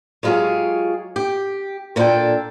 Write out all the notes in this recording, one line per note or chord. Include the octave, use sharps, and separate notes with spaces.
F#3 G#3 F4 G4 G#4 C#5
G4
A#2 C#4 D4 G#4 A4 G5